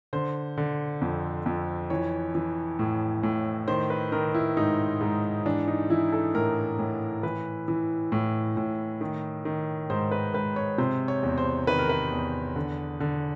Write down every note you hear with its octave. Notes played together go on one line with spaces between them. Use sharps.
D3 C5
D3
F2
F2
E3 C#5
E3
A2
A2
D#3 C5
B4
D#3 A#4
E4
G#2 D#4
G#2
E3 D4
D#4
E3 E4
A4
A2 A#4
A2
E3 B4
E3
A2
A2
D#3
D#3
G#2 C5
B4
G#2 B4
C#5
C3 C5
C#5
E2
C5
D#3 B4
A#4
B4
E2
D3
D3